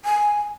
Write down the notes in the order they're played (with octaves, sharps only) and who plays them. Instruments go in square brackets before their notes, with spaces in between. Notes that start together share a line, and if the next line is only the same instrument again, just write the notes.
[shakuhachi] G#5